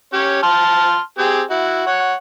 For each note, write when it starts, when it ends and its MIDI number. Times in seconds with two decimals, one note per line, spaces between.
0.13 0.38 61
0.13 0.38 67
0.13 0.38 73
0.43 1.00 81
0.43 1.00 84
0.43 1.00 89
1.18 1.42 60
1.18 1.42 67
1.18 1.42 68
1.50 1.83 64
1.50 1.83 66
1.87 2.14 73
1.87 2.14 78